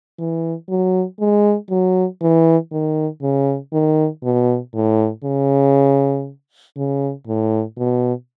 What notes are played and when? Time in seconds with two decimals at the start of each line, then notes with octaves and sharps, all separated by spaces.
0.19 E3
0.69 F#3
1.20 G#3
1.70 F#3
2.22 E3
2.72 D#3
3.22 C#3
3.73 D#3
4.23 B2
4.74 A2
5.24 C#3
6.76 C#3
7.27 A2
7.78 B2